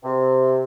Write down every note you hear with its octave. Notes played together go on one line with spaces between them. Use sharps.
C3